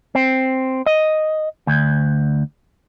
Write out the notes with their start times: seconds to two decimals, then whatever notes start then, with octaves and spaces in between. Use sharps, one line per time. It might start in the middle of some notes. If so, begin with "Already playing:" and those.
0.15 C4
0.86 D#5
1.67 D2